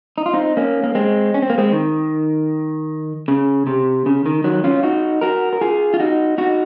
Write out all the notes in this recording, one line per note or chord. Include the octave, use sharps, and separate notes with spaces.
D#4
F4
C4 D#4
A#3 C#4
A#3
G#3 C4
C#4
C4
A#3
G#3 C4
D#3
C#3
C3
C#3
D#3
D#3 F#3
C#4 F4
D#4 F#4
F#4 A#4
A#4
F4 G#4
F4
D#4 F#4
D#4 F#4